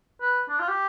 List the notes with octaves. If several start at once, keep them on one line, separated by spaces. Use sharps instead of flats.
B4
D4
F4
G4